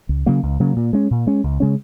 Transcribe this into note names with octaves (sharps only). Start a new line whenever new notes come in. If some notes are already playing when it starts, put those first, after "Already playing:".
C#2
C#3 F#3 A#3
C#2
C#3 F#3 A#3
A#2
G#3 C#4
A#2
G#3 C#4
C#2
C#3 G#3 C#4